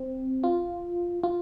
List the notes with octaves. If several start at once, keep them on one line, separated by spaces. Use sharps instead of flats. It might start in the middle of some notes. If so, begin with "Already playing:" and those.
Already playing: C4
F4
F4